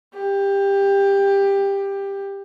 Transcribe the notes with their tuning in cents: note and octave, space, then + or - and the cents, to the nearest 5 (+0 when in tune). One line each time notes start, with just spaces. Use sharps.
G4 +15